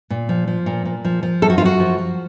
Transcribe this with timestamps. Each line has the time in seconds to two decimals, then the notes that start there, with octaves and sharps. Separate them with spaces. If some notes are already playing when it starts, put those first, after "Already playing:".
0.10 A#2
0.29 F3
0.47 F3
0.66 A#2
0.85 A#2
1.05 F3
1.23 F3
1.42 F#2 A4
1.50 F#4
1.58 F4
1.61 F#2 F#4
1.80 F3
1.98 F3